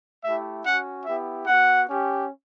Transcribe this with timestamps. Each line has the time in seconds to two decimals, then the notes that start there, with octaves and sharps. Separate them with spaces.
0.24 A3 E4 G4 E5
0.65 C#4 F#4 F#5
1.05 B3 E4 G4 E5
1.46 B3 F#4 F#5
1.87 C#4 G4